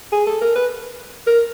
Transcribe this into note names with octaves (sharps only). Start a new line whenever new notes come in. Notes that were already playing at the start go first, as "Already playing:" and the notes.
G#4
A4
A#4
B4
A#4